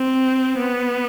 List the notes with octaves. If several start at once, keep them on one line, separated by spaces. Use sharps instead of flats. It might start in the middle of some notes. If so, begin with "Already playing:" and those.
Already playing: C4
B3